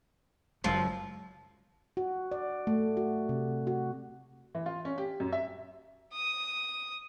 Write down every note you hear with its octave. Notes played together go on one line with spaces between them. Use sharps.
F#1 F#2 F3 F#3 G#3
F#4
D5
A3
F#4
C3
F#4
E3
F4
C#4
G4
F#2
E5
D#6